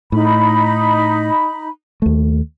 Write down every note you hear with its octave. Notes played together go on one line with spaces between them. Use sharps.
A2 D#4 B5
D#2 A3